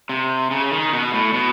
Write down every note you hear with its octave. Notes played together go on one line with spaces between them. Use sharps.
C3
C#3
D#3
B2
A2
B2